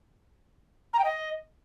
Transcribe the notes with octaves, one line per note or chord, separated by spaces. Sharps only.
A#5
G5
D#5